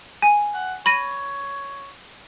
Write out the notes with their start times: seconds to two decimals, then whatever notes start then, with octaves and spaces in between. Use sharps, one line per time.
0.22 G#5
0.54 F#5
0.86 C#5 B5 A#6 D#7